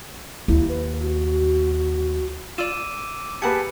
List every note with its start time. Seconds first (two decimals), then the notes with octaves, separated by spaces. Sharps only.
0.48 D#2 E4
0.69 B4
1.00 F#4
2.58 F4 D5 D6 E6 D#7 E7
3.42 A#3 G4 G#4 B4 F#5 A5 G#6 C#7